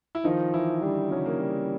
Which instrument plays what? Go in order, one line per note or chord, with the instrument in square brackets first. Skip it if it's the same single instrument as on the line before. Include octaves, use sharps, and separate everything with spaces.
[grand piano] E4
[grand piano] D#3 D#4 [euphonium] F3
[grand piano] E3 E4
[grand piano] D3 D4 [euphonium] G3
[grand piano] C#3 C#4 [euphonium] F#3
[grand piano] A#3
[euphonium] G3